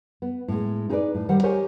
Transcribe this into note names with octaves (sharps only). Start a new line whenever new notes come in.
B3
A2 G#3
D#4 G4 G#4 A#4 B4 D5
A2
D#3 G3 C5 F#5
G4 A#4 C5 C#5 D#5 G#5